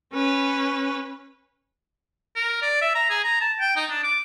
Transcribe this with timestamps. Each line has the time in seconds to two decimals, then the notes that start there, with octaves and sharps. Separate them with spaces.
0.13 C#4 B4
2.36 A#4
2.62 D5
2.81 E5
2.95 A#5
3.10 G#4
3.24 A#5
3.41 A5
3.60 G5
3.76 D#4
3.90 D4
4.03 D6